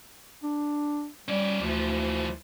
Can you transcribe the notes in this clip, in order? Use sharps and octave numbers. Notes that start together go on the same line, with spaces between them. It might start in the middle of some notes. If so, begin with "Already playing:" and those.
D4
G3 C#4 D5
D2 E3 F3